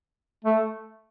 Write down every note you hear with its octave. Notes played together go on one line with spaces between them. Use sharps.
A3